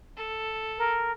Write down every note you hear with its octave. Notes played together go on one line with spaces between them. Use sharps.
A4
A#4